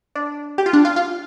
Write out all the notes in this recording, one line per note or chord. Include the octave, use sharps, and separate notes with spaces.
D4
G4
F4
D4
F4
F4